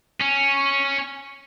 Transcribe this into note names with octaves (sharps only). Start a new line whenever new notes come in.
C#4